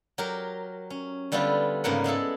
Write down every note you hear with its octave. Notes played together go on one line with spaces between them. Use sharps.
F#3 G4 A#4
C#4
D3 G3 B3 E4 F4
G#2 C#3 A#3 B3 A#4 F#5
G#3 B3 E4 A4